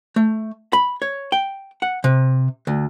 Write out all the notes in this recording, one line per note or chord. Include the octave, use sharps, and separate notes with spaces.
A3
B5
C#5
G5
F#5
C3
D2